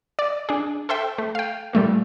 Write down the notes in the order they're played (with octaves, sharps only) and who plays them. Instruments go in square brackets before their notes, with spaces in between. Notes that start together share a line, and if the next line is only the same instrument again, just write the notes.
[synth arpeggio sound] D5
D4 G#4
A4 C5 E5 G5
A3
F5 G5
A#2 G3 A3 A#3